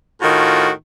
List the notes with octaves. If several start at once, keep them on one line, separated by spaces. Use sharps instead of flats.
A2 D#3 F4 F#4